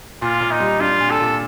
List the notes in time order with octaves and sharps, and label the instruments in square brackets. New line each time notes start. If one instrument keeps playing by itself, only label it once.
[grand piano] A#2 [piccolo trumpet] F4
[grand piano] A#2
[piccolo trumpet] D#4
[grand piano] G3
[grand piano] D4 [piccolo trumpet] F4
[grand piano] A#2
[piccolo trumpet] A4
[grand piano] A#2